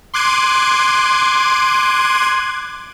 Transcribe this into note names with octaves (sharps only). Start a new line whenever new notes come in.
C6 D6 F#6 G#6 D#7